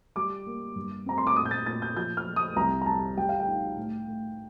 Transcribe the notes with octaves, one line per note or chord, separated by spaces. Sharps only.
G3 D6
A#3
G2
C4 A#5
C6
D6
A#2 D#6
G6
A6
A#2 A6
G6
F3 G6
F6
F3
D#6
C2 A#5
A#5
G3 A5
G3 G5
F5
G5
D#4
A2
A3